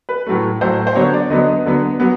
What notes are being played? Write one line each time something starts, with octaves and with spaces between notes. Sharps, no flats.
B4
A2 F#3 A3
A2 F#3 A3 C5
C5
D3 F#3 B3 C#5
D5
D3 F#3 B3 D#5
D3 F#3 B3
F#3 B3